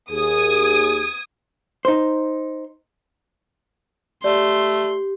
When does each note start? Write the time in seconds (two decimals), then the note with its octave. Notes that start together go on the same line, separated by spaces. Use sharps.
0.10 D#2 G#4 D#6 G#6
1.85 D#4 C5
4.24 A3 G4 D5 C6